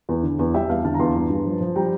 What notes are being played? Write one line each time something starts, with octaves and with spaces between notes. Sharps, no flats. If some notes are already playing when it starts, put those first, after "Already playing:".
E2
D3
E2
G3 E5 G5
E2 F5 A5
D3 F5 A5
A#5
E2 A5 C6
G2
G2
F3
F3
G3 G5 A#5